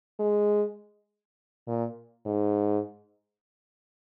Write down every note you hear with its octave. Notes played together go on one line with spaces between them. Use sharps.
G#3
A#2
G#2